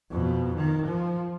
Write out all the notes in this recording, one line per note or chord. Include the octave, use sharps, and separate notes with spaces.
F2 B2
D#3
F3